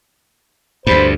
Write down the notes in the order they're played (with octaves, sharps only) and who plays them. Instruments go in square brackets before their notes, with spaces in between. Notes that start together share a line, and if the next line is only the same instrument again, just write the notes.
[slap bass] D2 G2 [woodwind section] C5 B5